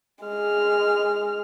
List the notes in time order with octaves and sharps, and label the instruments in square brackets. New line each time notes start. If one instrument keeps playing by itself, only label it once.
[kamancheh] G#3 F6